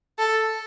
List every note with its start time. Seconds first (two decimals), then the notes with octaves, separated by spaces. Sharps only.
0.19 A4